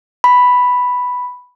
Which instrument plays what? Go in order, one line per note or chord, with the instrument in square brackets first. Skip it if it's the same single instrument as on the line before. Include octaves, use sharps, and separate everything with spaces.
[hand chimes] B5